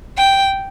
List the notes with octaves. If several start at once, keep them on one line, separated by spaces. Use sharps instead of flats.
G5